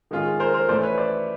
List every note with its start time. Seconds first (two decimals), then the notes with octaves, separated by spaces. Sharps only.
0.11 D#3 G#3 C#4 F4 G#4
0.40 A#4 C5
0.54 A#4 C5
0.69 E3 A3 C#4 C5 D5
0.83 B4 C#5
0.97 C5 D5